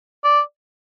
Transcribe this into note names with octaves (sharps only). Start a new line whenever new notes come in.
D5